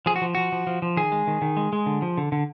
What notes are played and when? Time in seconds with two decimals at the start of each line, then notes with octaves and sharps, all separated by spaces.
0.06 F3 G#4
0.16 F#4
0.22 F3
0.35 F3 F#4
0.52 F3
0.67 F3
0.82 F3
0.97 D#3 G#4
1.12 G#3
1.27 D#3
1.42 D#3
1.57 G#3
1.73 G#3
1.86 D3
2.02 F3
2.18 D3
2.32 D3